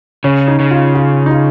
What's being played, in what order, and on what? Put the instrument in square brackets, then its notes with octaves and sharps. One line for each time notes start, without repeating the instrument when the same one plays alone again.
[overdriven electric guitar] C#3 [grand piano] C#4
[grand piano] D#4
[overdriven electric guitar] C#3
[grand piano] F4
F4
D#4
F4